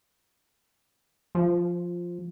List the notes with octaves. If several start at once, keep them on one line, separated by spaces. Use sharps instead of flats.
F3